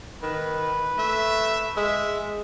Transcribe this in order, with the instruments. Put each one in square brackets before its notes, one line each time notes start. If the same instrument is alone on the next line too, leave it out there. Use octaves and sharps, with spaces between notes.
[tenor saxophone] D#3 [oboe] B4
[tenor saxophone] A3 [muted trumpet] E5
[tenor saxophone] G#3 [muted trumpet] E5